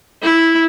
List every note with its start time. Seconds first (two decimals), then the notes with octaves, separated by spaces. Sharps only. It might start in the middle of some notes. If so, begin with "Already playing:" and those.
0.23 E4